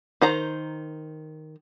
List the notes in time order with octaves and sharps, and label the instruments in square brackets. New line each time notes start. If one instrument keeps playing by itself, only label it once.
[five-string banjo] D#3 C5 A#5